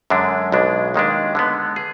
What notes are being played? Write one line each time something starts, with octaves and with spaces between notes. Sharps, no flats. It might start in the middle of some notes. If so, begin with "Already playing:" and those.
F#2 D3 G#3 D4
B1 B2 G#3 D4
D#2 D#3 G#3 D4
D3 G#3 B3
G#4